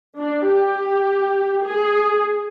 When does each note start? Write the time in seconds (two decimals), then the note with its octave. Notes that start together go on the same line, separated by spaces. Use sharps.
0.17 D4
0.47 G4
1.64 G#4